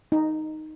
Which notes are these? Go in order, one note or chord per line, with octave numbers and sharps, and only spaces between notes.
D#4